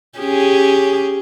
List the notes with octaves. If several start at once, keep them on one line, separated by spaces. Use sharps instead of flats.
C#4 G4 G#4